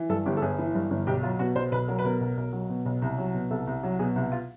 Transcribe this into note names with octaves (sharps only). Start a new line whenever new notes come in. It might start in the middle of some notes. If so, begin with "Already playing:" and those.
Already playing: E3
G2 A4
G1 G4
A4
G1 G#4
E3
G2
G1
B1 G4
F#3 F4
B2 F#4
B1 C5
B1 B4
F#3 A#4
B4
B2 A#4
B1
B1
F#3
B2
B1
C2
F#3
B2
C2 A4
C2
F#3
B2 G#4
C2
F4